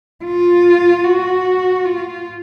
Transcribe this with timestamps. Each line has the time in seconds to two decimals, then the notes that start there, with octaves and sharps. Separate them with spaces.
0.24 F4
1.04 F#4
1.85 F4